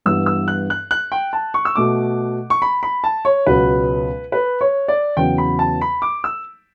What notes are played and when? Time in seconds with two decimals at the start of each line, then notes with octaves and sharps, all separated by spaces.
0.06 G2 E3 G3 B3 E6
0.26 E6
0.48 F#6
0.70 F#6
0.91 F#6
1.12 G5
1.33 A5
1.54 C#6
1.65 E6
1.76 B2 A3 D6
2.50 C#6
2.62 B5
2.83 B5
3.04 A5
3.25 C#5
3.46 C#2 B2 F#3 B3 B4
4.32 B4
4.61 C#5
4.88 D5
5.17 E2 C#3 F#3 B3 G5
5.38 B5
5.59 A5
5.81 B5
6.02 D6
6.24 E6